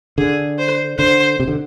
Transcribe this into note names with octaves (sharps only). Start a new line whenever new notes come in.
D3 G#4
C5
D3 C5
C3
D3